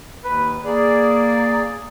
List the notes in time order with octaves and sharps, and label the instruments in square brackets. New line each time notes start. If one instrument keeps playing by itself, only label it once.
[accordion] D#2 [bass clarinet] B4
[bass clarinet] A#3 [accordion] G#4 D5